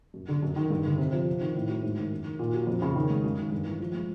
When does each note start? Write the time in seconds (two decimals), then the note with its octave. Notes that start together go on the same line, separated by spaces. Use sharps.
0.14 F#2
0.28 D3
0.43 F#2
0.56 D#3
0.70 G2
0.85 D3
0.98 C3
1.13 F3
1.27 C3
1.41 D#3
1.55 A2
1.69 F#3
1.83 G#2
1.97 D#3
2.12 F#2
2.25 D#3
2.39 A#2
2.54 F#3
2.67 F2
2.82 C#3
2.95 D#3
3.10 G#3
3.24 F#2
3.38 D#3
3.52 G2
3.65 E3
3.80 F3
3.94 G#3